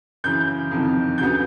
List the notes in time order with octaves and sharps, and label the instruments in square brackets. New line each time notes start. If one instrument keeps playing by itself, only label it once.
[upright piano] F#2 C#3 E3 G6
F2 C3 D#3
D2 C#3 F#3 B3 G6